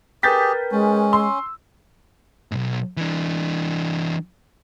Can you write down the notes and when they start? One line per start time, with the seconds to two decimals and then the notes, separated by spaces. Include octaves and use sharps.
0.23 G4 G#4 A#4 B4 G5 G6 A6 B6
0.71 G#3 C#4
1.13 C6 E6
2.52 B1 G#2
2.97 E3 D4